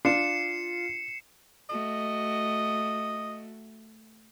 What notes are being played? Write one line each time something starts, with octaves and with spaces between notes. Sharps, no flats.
D4 F4 C7 C#7 E7
A3 F#4 D#5